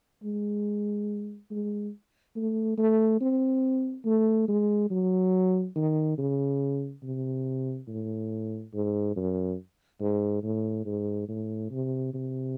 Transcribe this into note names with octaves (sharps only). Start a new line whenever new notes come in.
G#3
G#3
A3
A3
C4
A3
G#3
F#3
D#3
C#3
C3
A2
G#2
F#2
G#2
A2
G#2
A2
C3
C3